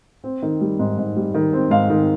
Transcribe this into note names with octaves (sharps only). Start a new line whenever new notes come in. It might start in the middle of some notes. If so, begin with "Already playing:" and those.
C4
D#3
G3
G#2
G#2
G3
D#3
C4
G#2 F5
D#3